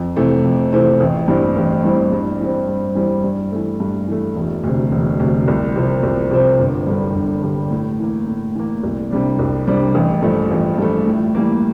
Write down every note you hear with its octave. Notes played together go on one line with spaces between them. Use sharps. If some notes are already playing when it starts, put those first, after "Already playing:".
Already playing: F2
C3 E3 A3 C4
F2
C3 E3 A3 C4
A1
G2 E3 G3 C4
A1
G2 E3 G3 C4
G2
E3 G3 C4
G2
E3 G3 C4
G2
E3 A3
G2
E3 A3
E1
D2 C3
E1
D2 C3
C2
C3 F3 C4
C2
C3 F3 C4
G1
G2 D3 G3
G1
G2 D3 G3
A2
E3 A#3
A2
E3 A#3
C2
C3 G3 D4
C2
C3 G3 D4
A1
G2 F3 A3
A1
G2 F3 A3
A2
E3 G3 A#3